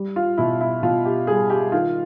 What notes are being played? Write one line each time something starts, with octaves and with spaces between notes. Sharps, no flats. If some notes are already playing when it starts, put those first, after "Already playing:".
Already playing: G3
F4
B2 E4
E4
B2 F4
G4
G3 G#4
G4
D#3 F4